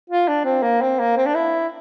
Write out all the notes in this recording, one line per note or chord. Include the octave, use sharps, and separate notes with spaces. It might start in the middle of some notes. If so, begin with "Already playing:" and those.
F4
D4
C4
A#3
C4
A#3
C4
D4
E4